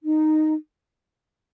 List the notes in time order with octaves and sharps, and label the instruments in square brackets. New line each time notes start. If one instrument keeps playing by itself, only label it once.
[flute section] D#4